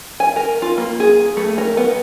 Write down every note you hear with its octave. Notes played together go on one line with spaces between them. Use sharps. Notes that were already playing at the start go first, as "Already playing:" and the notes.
G#5
A#4
F4
A#3
G#4
A3
A#4
B3